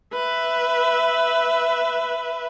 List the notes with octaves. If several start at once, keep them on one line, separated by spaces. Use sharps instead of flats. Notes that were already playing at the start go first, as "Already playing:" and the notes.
B4 E5